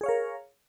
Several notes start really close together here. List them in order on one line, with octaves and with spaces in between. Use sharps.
G#4 C#5 F5 A#4